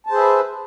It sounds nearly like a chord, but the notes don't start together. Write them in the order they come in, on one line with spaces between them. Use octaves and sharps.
A5 C5 G#4 E5 B4